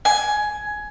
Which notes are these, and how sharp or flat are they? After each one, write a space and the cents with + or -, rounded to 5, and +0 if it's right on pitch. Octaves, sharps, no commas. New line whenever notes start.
G#5 +15